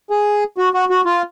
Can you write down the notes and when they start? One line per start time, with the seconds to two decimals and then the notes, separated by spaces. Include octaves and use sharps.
0.10 G#4
0.58 F#4
0.74 F#4
0.90 F#4
1.06 F4